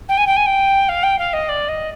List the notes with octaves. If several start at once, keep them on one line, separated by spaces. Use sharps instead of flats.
G5
G#5
G5
G#5
G5
F5
G5
F5
D#5
D5
D#5